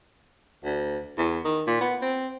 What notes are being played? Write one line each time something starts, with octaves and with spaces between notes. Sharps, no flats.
D2
E2
D#3
A#2
B3
C4